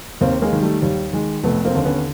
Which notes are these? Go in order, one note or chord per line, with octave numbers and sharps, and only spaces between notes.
D#2 A#3 C4
G#3 A#3
D#3
G3 A3
D#2 G3
D#3 G#3
F1 A3 B3
A#3 C4
D#2 D3
B3 C#4